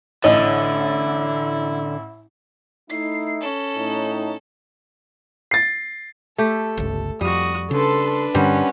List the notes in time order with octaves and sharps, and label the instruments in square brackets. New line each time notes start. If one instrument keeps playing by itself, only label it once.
[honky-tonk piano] A1 [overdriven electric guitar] D3 [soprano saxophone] E4 [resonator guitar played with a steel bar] D#5
[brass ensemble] A3 D#4 E4 [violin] C7
[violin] C#4 A4
[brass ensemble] A2 D#4
[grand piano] A6 C7
[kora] A3 G4 [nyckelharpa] A4
[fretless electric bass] G1 C#2
[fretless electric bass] F2 [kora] G3 [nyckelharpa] F#4 D#6
[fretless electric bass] C#3 [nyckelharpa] D4 B4 [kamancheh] A4 C6
[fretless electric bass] G2 D3 [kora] G3 C4 A#4 [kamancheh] C#4 F#5